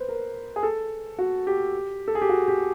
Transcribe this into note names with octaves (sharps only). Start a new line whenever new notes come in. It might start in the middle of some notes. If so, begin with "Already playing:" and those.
Already playing: B4 C5
A#4
G#4
A4
F#4
G4
A4
G#4
G4
F#4
G4